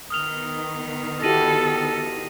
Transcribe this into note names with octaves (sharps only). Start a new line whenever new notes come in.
D#3 B3 D#6 F6 F7
E4 F#4 G4 A4 A#6 D#7 F#7